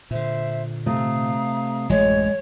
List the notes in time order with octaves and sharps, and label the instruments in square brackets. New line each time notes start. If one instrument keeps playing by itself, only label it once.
[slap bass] A#2 D3 [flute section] C5 E5
[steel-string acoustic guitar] C3 A3 [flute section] F5 A#5 D#6
[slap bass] A1 F#2 [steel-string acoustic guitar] G#3 [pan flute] C#5